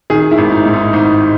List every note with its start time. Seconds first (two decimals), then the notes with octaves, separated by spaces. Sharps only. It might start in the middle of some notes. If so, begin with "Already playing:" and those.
0.10 D#3 G#4
0.31 E4
0.38 G#1
0.51 D#4
0.66 G#2
0.73 D#4
0.93 G#1 D#4